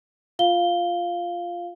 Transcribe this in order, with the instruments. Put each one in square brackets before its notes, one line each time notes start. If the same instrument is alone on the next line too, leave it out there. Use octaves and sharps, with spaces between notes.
[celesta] F4 F5 G7